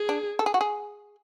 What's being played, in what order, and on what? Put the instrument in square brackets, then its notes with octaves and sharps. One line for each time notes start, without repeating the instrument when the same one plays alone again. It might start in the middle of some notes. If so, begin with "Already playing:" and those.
Already playing: [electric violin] G#4
[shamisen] D4
A4
G#4
F#4
G#4